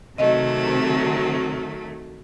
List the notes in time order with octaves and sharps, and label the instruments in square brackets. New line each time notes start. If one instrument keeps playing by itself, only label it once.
[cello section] C3 [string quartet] D#3 F#3 A3 [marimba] D#5